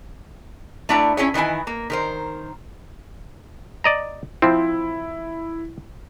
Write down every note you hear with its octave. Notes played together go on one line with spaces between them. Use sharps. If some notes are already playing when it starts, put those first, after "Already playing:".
A3 D4 E4 G5 A#5
C#4 E4 G#4 C#5
D#3 E3 F#3 E4 G#5
A#3
D#3 A#4 C5
D5 D#5 A#5
F3 C4 E4